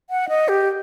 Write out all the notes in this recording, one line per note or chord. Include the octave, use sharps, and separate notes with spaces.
F#5
D#5
G4